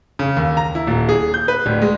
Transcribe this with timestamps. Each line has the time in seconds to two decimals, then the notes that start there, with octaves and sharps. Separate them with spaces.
0.19 C#3
0.37 D#2
0.57 A#5
0.75 E4
0.87 D#1
1.09 G#4
1.34 G6
1.48 B4
1.66 D1
1.82 G#3